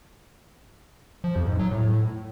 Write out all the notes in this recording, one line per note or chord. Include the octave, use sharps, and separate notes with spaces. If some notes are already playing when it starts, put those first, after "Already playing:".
F3
F2
G#2
F#3
A2